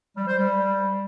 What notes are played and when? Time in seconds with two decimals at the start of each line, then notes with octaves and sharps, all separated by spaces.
0.16 G3
0.27 C5
0.38 G3